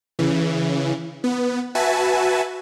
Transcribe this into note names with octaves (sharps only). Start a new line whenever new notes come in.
C#3 E3
B3
F#4 B4 E5 G#5 A5